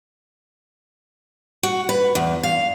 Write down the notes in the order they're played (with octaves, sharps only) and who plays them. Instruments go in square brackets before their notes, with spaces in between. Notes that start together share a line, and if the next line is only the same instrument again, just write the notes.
[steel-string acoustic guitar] F#4
B4
E2
F5